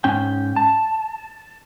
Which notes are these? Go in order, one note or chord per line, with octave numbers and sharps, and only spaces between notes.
G#2 C#4 G5
A5